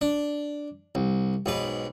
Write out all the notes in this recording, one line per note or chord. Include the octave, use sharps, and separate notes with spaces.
D4
C2
B1 G#2 B4